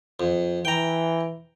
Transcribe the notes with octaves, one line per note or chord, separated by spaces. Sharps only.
F2
E3 G5 A#5